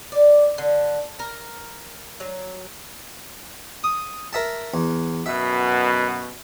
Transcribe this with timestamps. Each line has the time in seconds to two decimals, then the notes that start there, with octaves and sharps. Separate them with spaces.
0.12 D5
0.58 D3
1.19 A#4
2.20 F#3
3.84 D#6
4.33 A#4 E5 A5
4.74 E2
5.26 F#2 B2 E5